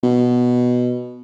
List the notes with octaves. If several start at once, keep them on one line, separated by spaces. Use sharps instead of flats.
B2